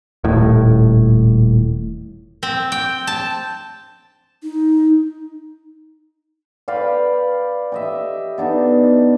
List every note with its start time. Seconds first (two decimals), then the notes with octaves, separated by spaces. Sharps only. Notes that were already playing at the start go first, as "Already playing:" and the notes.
0.24 D#1 A2
2.43 C4
2.72 G5
3.07 A5
4.43 D#4
6.68 B4 D5 F5 G5
7.72 G4 D#5 E5
8.38 B3 D4 D#4